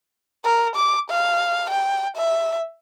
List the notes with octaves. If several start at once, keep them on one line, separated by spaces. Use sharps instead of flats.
A#4
D6
F5
G5
E5